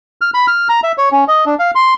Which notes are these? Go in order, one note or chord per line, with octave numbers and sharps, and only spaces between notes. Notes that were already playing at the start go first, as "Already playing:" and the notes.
F6
B5
F6
A#5
E5
C#5
C#4
D#5
D4
F5
C6